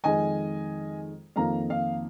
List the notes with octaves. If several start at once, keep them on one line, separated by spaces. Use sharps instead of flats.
F2 D#3 G#3 D#5 G#5
F2 D#3 A#3 F5 A#5
F5